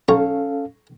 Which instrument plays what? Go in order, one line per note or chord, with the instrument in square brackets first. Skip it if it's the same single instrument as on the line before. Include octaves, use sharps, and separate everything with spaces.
[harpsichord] B1 A#5 C#6 [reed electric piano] C#4 A4 F5